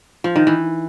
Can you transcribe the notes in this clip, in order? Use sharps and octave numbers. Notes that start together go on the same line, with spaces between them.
F3
D#3
E3